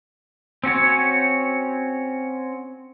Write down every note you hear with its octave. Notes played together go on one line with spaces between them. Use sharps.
C4 C#4 F#4 C#5